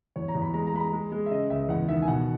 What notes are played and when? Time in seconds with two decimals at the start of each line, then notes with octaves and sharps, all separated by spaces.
0.16 E2 C#5
0.28 A#5
0.35 E2
0.42 B5
0.54 G#3 A#5
0.67 A#5
0.73 G#3 B5
0.80 A#5
0.93 G#3
1.12 G#3
1.26 E5
1.31 C#3 D#5
1.50 C#2 E5
1.69 E2 F#5
1.89 D#3 E5
2.02 G#5
2.08 B2 F#5